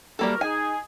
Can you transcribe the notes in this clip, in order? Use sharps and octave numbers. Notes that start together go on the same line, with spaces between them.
E3 G3 A#3 F#4 A4 A#4
D#4 G#4 G#5